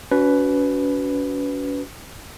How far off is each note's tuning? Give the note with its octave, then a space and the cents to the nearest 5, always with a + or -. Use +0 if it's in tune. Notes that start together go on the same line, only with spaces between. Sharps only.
C#4 +40 F#4 +0 B4 +5